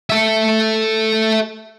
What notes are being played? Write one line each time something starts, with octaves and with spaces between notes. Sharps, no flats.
A4 E5